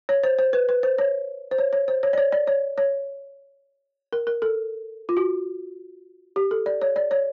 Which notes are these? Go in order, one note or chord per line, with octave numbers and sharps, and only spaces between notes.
C#5
C5
C5
B4
B4
C5
C#5
C5
C#5
C#5
C5
C#5
D5
C#5
D5
C#5
C#5
A#4
A#4
A4
F4
F#4
G4
A4
D5
C#5
D5
C#5